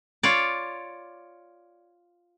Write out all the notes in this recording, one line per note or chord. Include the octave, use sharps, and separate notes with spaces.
F4 C#5 D5